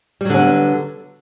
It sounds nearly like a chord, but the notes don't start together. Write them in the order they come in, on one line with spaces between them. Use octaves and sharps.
G3 F#3 D3 C#4 B3